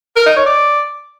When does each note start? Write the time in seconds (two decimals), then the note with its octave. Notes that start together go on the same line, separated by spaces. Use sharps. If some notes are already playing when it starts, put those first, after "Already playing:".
0.16 A#4
0.26 D#4
0.36 C#5
0.46 D5